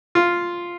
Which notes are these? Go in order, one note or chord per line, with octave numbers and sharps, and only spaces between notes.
F4